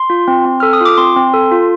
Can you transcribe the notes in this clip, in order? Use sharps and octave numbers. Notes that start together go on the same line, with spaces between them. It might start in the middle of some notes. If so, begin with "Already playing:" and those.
Already playing: C6
F4
C4
C4
A4 F6
D#6
F4 D6
C4 C6
C4
A4
F4